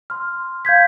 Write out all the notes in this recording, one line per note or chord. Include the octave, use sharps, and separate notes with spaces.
C6 F6
F5 G6 G#6 B6